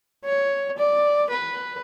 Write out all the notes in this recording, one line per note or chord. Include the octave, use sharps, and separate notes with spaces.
C#5
D5
B4